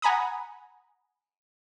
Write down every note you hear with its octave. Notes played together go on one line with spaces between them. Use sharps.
F#5 G#5 A#5 B5 D#6